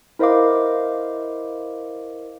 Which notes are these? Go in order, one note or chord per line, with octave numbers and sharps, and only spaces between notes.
E4 A#4 C5 D#5 F5 D6